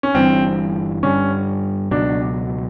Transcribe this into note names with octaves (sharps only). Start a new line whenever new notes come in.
C#4
G1 G2 E3 C4
G2 D3 G3 C#4
C#2 B2 F#3 D4